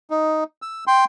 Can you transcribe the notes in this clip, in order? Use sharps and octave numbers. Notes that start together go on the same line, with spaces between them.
D#4
E6
G5 C6